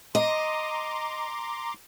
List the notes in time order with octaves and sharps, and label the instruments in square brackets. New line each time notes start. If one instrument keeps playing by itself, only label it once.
[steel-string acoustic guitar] D#5 [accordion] A#5 C6 D6